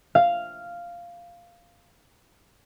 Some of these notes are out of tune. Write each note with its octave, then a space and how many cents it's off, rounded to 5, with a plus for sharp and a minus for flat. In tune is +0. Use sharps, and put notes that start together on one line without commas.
F5 -5